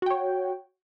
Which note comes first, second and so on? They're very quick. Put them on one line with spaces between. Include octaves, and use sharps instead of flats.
F#4 G5 C#5